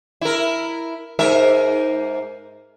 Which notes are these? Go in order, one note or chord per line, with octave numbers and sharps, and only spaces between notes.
E4 A#4
G#2 A#4 E5